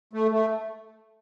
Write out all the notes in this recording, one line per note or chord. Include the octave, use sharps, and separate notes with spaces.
A3
A3